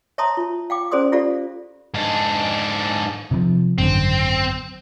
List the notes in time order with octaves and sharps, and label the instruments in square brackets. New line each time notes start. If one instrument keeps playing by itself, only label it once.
[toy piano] C#5 E5 A5 A#5 C6 D#6
F4
F5 G5 D6
C#4 G#4 C5 D5 C6 D#6
F4 G4 A4 D5 F5
[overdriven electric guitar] G#2 D4
[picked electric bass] C3 D#3 F3
[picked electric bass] G#1 F#2 D3 [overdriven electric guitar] C4